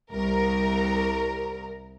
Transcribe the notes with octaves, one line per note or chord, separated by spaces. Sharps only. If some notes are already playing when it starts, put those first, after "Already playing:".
C2 A#4